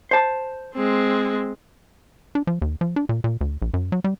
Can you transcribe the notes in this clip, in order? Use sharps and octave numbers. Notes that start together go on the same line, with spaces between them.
C5 A5
G#3 C4
D4
F3
D#2
F3
D4
A#2
A#2
D2
A#1
F#2
F#3
G3